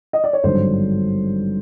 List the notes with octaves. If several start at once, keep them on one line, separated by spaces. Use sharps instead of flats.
D#5
D5
C#5
G#1 G2 D3 F#3 C5